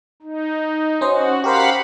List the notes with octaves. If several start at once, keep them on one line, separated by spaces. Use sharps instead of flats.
D#4
C#4 F#4 C5 D#5
G4 A#4 C5 F5 F#5 B5